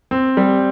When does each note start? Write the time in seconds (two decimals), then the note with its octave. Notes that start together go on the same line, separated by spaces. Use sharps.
0.11 C4
0.37 G3